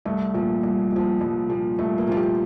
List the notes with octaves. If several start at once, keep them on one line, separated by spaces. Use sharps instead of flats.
C2 A3
A#2 F3
C2
A#2 F3
C2
A#2 F3
C2 A3
A#3
A#2 F3 F4
G4